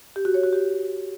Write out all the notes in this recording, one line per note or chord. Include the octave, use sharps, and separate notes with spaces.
G4
F#4
C#5
F#4
G4